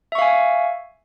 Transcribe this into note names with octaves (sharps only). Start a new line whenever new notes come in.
E5 F5 G#5 C#6